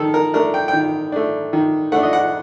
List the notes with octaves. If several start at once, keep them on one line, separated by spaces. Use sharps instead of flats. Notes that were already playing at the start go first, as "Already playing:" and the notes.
Already playing: D#3 A4
A#4
A3 D4 A#4
G5
D#3 G5
A3 D4
D#3
A3 D4 F#5
D#5
F#5